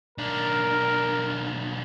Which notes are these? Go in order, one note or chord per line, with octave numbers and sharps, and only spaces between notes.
B1 D4 A#4